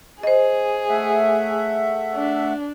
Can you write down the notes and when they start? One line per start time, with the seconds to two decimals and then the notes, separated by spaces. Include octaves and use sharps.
0.23 G#4 C5 D#5
0.89 A3 E5 F#5
2.15 D4